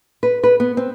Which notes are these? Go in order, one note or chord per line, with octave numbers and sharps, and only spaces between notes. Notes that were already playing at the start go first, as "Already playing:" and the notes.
B4
B4
B3
C4